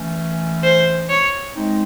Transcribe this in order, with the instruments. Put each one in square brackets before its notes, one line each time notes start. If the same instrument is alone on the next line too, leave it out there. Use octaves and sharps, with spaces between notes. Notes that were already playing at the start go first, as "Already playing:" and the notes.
Already playing: [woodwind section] E3 A3 C#4
[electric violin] C5
C#5
[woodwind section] G#3 C4 D#4